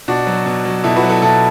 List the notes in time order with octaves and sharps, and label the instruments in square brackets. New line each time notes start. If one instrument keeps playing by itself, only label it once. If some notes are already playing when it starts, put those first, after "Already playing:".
[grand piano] B2 D4 F#4
F#3
B2
F#3
B2 E4 A4
F#4 B4
F#3
E4 A4
B2 E4 A4